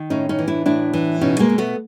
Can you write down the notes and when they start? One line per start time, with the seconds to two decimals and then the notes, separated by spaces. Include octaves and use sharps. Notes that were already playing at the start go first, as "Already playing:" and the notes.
Already playing: D#3
0.10 A2 C#4 D#4
0.29 C#4 D#4
0.39 E3
0.48 D4 E4
0.66 A2 D4 E4
0.93 E3
1.21 B2 C#4 D#4
1.39 G#3 A#3
1.49 B2
1.58 A3 B3